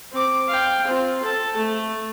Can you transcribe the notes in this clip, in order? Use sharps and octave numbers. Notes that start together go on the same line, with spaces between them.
C4 D6
F5 G5
C4 F4
A4 A5
A3